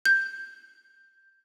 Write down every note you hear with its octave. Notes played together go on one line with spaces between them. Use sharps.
G6